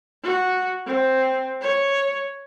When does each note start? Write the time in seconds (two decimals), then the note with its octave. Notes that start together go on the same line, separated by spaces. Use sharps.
0.23 F#4
0.87 C4
1.62 C#5